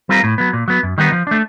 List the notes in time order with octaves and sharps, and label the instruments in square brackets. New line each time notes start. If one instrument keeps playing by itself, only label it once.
[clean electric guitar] G3 C4 F4 A#4
A2
F#3 B3
A#2
F#3 B3
F#2
D#3 G3 B3 D#4
F3
A3 D4